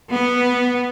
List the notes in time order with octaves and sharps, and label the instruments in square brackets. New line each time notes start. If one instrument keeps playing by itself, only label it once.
[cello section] B3